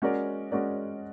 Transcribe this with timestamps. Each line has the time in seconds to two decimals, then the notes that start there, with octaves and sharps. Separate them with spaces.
0.02 G#3 C#4 F#4 A#4 D5
0.52 G#3 C#4 F#4 A#4 D5